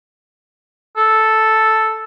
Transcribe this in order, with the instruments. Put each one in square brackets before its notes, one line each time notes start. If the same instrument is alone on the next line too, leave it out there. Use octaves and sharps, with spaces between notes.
[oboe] A4